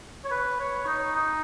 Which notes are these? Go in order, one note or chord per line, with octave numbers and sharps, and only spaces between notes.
C#5
B4
C#5
D#4
D#4